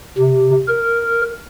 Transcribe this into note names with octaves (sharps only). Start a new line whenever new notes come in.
C3
A#4